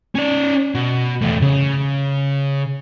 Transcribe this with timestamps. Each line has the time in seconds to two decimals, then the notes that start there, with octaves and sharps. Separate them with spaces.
0.15 C#4 D5
0.75 B2
1.22 E2 A3
1.42 C#3